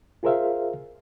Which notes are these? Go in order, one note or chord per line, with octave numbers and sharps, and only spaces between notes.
F4 G#4 A#4 C5 E5 F5